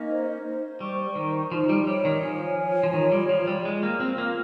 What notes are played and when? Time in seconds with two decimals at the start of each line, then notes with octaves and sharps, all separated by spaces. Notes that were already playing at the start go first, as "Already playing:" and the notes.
Already playing: A#3 C#4 D#4 D#5
0.09 C5
0.44 C5
0.80 G3 C#6
1.15 D#3 C5
1.51 F3 D#4
1.69 G3
1.87 G3 C#5
2.05 D#3
2.22 F3 G#5
2.58 C#5
2.83 F3
2.93 D#3 F4
3.12 G3
3.29 F3 F4
3.47 G3
3.65 G#3 F4
3.83 A#3
4.00 C4 F4
4.18 A#3